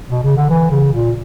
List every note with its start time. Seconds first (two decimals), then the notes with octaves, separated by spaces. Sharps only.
0.10 B2
0.23 C#3
0.36 D3
0.50 E3
0.71 C#3
0.92 A#2